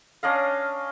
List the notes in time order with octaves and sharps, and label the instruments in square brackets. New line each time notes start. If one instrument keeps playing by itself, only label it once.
[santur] C#4 D4 D#5 F5